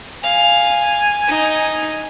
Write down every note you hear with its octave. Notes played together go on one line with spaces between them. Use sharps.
F5 G#5
D#4